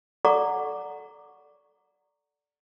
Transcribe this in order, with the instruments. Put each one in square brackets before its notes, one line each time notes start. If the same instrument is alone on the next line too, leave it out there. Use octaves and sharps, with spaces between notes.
[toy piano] A4 D5 F#5 A#5 C#6 D6